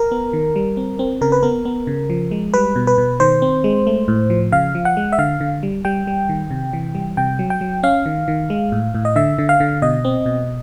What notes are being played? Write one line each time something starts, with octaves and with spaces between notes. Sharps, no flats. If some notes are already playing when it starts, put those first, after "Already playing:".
Already playing: A#4
B3
D#3
G3
C4
C4
C#3 A#4
B4
B3 A#4
B3
C#3
F3
G#3
G3 B4
B2
B4
B2
D#3 C5
C4
G#3
A3
A2
F3
C#3 F5
F3
F#5
G#3
E5
D3 F5
D3
G3
G3 G5
G3
D#3
C3
E3
G3
C3 G5
F#3
G5
F#3
C#4 F5
D#3
D#3
G#3
A2
A2
D#5
D3 E5
D3
F5
D3
B2 D#5
C4
B2